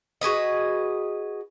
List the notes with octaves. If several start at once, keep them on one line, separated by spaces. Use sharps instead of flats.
F#4 G#4 B4 D#5